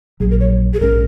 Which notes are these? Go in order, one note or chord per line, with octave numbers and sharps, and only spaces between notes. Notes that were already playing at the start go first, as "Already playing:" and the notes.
A#1 A#2 F#3 G#4
A#4
C#5
G#4
A#1 G#2 G#3 C#4 A#4